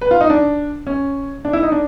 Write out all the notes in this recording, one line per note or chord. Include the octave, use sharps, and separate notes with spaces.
B4
F4
D#4
D4
C#4
D4
E4
D#4
D4